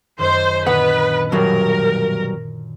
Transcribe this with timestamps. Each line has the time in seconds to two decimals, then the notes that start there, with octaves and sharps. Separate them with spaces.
0.18 F#2 D#3 C5
0.66 A#2 D3 D#3 B3 B4 F#5
1.32 B2 F#3 G3 A#4